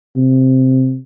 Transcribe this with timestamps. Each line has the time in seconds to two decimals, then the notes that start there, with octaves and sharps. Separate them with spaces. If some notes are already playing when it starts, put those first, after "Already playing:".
0.16 C3